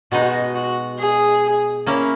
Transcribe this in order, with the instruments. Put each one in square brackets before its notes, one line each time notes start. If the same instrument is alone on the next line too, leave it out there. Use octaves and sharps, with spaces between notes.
[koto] B2 G#3 D#4 [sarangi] F#4
[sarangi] F#4
G#4
[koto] A#3 C#4 E4